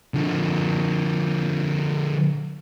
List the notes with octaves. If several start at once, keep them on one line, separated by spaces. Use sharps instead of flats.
D3 F3